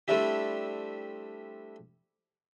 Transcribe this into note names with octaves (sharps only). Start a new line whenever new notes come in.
G3 A3 C4 D4 E4 G4